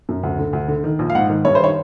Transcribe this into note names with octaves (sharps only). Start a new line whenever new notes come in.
F#2
D2
D3
D2
D3
D#3
A#1
F5
G#2 F#5
D#3
G2 C#5
C5
D#3 C#5